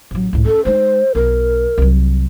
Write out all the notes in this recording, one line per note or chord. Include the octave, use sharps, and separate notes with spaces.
A1 F#3
C#2 A2
C#4 A4
G#3 D#4 C5
B1 A#4
C2 F#3